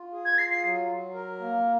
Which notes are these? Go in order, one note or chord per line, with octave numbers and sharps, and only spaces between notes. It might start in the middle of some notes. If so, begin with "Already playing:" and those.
Already playing: F4
G#4
G#6
F4 C7
C7
F#3
F#3
A#4
A#3